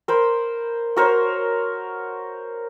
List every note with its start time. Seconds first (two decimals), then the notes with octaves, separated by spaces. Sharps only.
0.08 A#4 C5 B5
0.96 F#4 A#4 C5 C#5